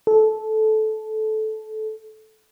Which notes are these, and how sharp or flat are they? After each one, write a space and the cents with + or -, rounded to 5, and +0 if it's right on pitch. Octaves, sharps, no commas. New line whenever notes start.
A4 -15